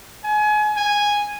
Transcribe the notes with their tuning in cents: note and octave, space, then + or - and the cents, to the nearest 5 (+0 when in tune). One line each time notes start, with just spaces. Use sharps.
G#5 +30
G#5 -10